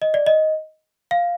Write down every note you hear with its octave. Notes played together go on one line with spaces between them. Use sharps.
D#5
D5
D#5
F5